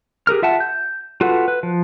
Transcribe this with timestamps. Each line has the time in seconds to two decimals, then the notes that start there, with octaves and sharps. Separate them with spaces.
0.27 G4 G#4 A#4 F6
0.42 F4 E5 F#5 A5
0.60 G6
1.21 F4 F#4 A4 B4 F#5
1.48 B4
1.63 F3